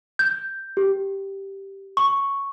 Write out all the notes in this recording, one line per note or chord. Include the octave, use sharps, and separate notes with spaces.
G6
G4
C#6